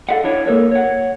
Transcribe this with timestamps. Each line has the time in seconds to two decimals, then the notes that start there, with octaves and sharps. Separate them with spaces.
0.09 A4 D5 D#5 F5 F#5
0.24 D4 E4 C#5
0.46 A#3 A4 A#4 C#5
0.71 C#5 F#5